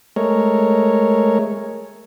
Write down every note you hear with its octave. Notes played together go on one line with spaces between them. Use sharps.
G#3 A3 A#4 C#5